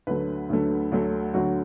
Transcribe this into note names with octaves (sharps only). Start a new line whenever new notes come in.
D2 D3 F#3 A3 B4
D2 D3 F#3 A3
D2 D3 F#3 A3
D2 D3 F#3 A3 F#4